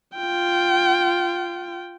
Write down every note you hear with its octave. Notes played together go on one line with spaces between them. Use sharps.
F4 G5